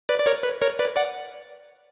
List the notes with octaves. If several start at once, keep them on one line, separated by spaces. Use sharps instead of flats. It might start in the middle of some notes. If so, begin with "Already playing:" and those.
B4 D5
D5
A#4 C#5
B4
A#4 C#5
B4 D5
D5 F#5